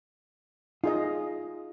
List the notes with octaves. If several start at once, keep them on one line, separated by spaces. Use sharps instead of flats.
D#4 F4 G#4 D#5